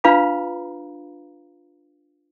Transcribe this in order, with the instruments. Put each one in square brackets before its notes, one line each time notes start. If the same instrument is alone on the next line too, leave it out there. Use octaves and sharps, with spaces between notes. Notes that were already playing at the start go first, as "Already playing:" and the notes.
[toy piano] D4 F4 B4 F5 A#5 B5